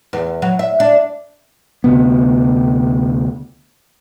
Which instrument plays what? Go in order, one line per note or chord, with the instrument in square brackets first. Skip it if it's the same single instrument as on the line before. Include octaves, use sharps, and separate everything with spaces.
[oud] E2
F#3
E5
D4
[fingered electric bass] D2 C3 B3